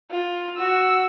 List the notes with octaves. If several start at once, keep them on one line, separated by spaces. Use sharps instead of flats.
F4
F#4 E6